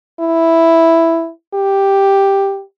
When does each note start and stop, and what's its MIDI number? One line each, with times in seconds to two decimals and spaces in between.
0.20 1.30 64
1.54 2.62 67